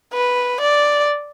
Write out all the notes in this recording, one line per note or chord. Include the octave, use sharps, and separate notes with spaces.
B4
D5